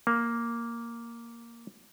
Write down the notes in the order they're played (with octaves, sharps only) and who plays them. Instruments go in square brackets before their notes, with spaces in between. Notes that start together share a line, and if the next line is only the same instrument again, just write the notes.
[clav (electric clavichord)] A#3